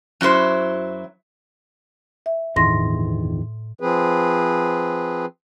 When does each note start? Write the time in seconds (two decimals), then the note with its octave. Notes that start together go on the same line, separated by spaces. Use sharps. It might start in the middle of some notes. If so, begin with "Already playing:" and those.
0.21 F#2 F#3 E4 C5
2.26 E5
2.56 G1 E2 A2 D#3 C6 A#6
3.80 F3 C4 G#4 B4